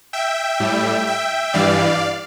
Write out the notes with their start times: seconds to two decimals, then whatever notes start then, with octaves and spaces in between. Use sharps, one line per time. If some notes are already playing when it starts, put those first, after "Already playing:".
0.13 E5 G5
0.60 A2 G3
1.07 E5 G5
1.53 G2 E3 G3 D5 F5